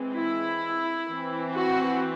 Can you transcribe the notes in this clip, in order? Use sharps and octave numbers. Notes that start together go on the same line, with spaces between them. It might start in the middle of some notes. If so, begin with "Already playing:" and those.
Already playing: E3 G#3 C4
E4
E3 C4
F#4